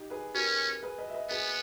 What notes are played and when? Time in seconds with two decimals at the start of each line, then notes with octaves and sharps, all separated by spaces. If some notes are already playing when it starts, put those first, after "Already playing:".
Already playing: D#4 G4
0.10 G#4 B4
0.35 C#4 G4 A#4
0.83 G#4 B4
0.98 B4 D#5
1.08 E5
1.14 B4 D#5
1.30 B3 G#4 B4